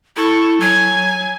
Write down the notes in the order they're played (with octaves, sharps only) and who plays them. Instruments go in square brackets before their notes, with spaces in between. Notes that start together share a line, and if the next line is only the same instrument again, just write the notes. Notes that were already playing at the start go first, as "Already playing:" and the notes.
[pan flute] E4 [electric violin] A4 C#6
[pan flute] F#3 [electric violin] G#5 G#6